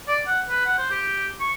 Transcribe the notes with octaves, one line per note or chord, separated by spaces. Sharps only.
D5
F#5
B4
F#5
C5
G4
C#6